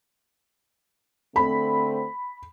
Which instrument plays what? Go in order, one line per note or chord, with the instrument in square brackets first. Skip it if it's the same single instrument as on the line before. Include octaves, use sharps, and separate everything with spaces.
[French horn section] D3 A3 C4 [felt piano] B5